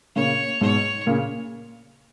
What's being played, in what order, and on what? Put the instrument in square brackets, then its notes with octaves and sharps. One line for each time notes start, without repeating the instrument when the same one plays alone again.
[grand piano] A#2 C#3 [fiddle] C#5
[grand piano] G#2 B2 [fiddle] C#5
[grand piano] A#2 C#3